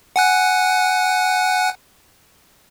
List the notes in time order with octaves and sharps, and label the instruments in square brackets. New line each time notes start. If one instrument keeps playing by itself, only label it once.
[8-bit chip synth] F#5 G#5 F#6